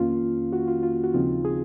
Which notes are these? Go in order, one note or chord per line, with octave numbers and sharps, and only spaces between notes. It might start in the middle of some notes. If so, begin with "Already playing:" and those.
Already playing: F2 D#3 A#3 C#4 F4
F#4
F4
F4
F#4
D#2 C#3 F3 C4 D#4 F4
G#4